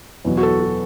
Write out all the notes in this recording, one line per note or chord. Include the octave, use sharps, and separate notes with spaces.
E2 B2 F#3
F#4
A4
F#4